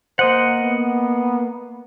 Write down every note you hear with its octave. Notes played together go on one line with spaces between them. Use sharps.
A#3 C5 D#5 F#5
B3